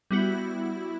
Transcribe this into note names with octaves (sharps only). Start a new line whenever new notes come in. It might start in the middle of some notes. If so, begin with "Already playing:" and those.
G3 B3 E4 F#4